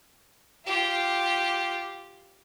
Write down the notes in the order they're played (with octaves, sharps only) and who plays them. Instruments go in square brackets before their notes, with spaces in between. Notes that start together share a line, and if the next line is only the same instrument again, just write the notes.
[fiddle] F4 G4